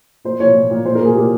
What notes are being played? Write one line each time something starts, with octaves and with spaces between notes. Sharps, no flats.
A#2 C5
A#2 C#5
A#2
A#2
A#2 C5
A#4
A#2 G#4
A#2 G4